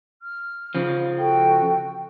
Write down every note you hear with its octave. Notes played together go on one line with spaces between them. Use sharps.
F6
C#3 F3
F#4 A4 G5